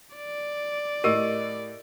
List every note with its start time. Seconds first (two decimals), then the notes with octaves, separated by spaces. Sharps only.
0.16 D5
1.04 A2 G4 A#4 D#5 D#7